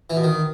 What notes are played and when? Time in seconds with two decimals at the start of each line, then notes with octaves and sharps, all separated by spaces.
0.10 E3
0.17 B2
0.24 D#3